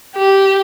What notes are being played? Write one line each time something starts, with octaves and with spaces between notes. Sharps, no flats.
G4